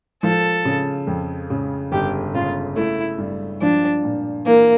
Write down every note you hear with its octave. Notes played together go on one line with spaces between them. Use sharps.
F3 A4
C#3
F2
C#3
G1 G4
C#3 F4
A3 E4
G2
F3 D4
A#2
E3 A#3